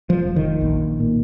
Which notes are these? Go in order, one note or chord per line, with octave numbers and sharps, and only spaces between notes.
F3
F1
D#3
A#1
A#2